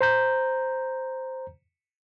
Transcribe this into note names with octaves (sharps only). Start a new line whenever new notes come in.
C5 A#5 G6